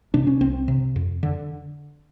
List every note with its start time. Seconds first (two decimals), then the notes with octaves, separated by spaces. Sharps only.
0.14 C3 D4
0.27 C#4
0.41 C2 C4
0.68 C3
0.96 F2
1.23 D3